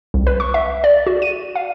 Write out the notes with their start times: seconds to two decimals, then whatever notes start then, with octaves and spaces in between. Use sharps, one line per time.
0.14 C2
0.27 B4
0.40 C#6
0.54 E5
0.84 D5
1.07 F#4
1.22 D#7
1.55 F5